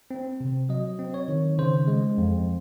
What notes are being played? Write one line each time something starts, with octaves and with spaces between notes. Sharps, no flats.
C4
C3
F#3 D#5
C4
C#5
D#3
C#3 C5
G#3
F2